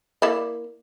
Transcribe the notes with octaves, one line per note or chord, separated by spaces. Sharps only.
A#3 E4 D5